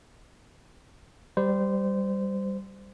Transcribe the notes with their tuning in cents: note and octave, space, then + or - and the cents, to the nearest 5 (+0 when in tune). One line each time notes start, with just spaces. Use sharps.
G3 +0 C5 -20